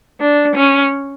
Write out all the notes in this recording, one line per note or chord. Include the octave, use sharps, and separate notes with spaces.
D4
C#4